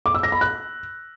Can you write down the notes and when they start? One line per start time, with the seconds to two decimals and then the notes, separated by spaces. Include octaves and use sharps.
0.06 D6
0.14 E6
0.23 A#6
0.32 B5
0.41 F#6